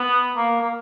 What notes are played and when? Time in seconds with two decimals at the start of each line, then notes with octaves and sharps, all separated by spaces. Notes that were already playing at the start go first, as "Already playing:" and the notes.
Already playing: B3
0.36 A#3
0.60 A#3